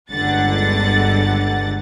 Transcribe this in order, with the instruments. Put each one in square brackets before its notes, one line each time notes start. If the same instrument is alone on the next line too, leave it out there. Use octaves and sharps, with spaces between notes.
[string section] G1 C#2 D3 F#5 A6